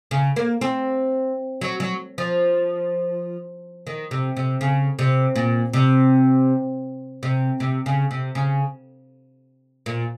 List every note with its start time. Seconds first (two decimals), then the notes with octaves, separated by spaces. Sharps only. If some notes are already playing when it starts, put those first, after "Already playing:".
0.11 C#3
0.36 A#3
0.61 C4
1.61 F#3
1.80 F#3
2.18 F3
3.87 D#3
4.11 C3
4.37 C3
4.61 C#3
4.99 C3
5.36 A#2
5.73 C3
7.23 C3
7.60 C3
7.86 C#3
8.11 C3
8.35 C#3
9.86 A#2